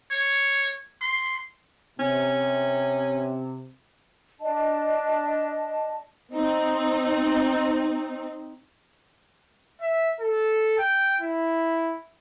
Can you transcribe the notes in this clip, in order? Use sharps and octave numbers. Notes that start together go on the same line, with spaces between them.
C#5
C6
C3 C#4
D4 D#5 A5
C4 D#4
E5
A4
G5
E4